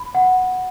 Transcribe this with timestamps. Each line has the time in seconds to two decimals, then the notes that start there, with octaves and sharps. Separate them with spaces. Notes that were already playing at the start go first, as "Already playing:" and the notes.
Already playing: B5
0.15 F#5